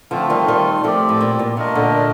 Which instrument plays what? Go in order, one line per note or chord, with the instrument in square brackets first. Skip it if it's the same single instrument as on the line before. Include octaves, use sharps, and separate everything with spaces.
[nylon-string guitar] D3 F3 [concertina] A3 C4 F4
[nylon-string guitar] D#3 G3
D#3 G3
[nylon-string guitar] F3 A3 [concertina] C4 G4 D5
[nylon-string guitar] A2
A#2
A#2
[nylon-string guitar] C3 [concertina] A3 D4 F4 A#4 D#5
[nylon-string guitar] A#2 D3